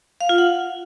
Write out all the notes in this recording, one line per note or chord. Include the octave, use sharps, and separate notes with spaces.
F5
F4
F#5